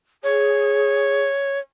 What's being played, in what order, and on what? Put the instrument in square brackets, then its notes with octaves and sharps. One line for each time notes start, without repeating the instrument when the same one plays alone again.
[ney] G#4 [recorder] C#5